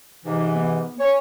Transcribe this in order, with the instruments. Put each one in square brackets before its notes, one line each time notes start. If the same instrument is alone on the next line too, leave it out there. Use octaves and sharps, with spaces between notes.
[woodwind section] G#2 C3 E3 [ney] D#4
[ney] B3
[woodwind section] C#5 [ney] G#5